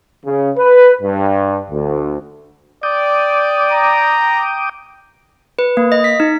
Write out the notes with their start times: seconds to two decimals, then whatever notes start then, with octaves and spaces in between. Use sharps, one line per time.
0.25 C#3
0.57 B4
1.02 G2
1.70 D2
2.83 D5 G5 D6 D#6
3.71 A#5
5.59 B4
5.77 A#3
5.92 D#5
6.04 B6
6.20 D#4